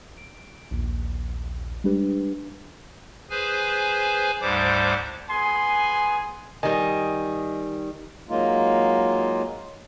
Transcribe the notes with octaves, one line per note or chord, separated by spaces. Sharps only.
D7
A#1 D#2
G3 G#3 D4 G4 B4
G#4 B4 C5 G#5
D2 G#2 G3 C5 D6
B3 G#4 G#5 C6
D#3 G3 D#5 G#5
F#3 G#3 A#3 D#4 F4